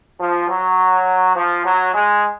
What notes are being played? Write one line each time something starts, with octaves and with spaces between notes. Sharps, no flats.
F3
F#3
F3
F#3
G#3